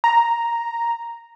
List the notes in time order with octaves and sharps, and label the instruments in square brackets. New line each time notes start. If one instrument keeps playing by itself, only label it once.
[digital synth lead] A#5